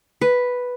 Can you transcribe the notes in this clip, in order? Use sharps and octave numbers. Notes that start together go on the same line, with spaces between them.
B4